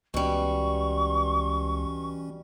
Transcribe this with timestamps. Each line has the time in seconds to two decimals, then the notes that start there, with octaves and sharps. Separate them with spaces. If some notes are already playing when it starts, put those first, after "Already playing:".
0.14 C#2 B2 E3 G3 C#4 C#6